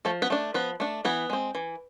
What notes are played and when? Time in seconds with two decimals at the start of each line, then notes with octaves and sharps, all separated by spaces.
0.05 F3 A3 A4
0.22 B3 B4
0.30 A3 D4
0.54 F3 B3 B4
0.80 A3 D4
1.05 E3 B3 B4
1.30 G#3 C4
1.55 E3